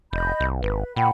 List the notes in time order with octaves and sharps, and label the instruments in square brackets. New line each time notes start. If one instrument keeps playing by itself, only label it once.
[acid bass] F1 [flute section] D#5 B5 G6
[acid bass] C2
[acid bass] G#1 [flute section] B4
[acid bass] A#2 [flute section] F#5 G5 B5